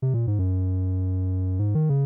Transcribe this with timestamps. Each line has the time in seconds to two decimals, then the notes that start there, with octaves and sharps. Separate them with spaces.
0.02 C3
0.14 A#2
0.27 G#2
0.39 F#2
1.59 G#2
1.75 D#3
1.89 C#3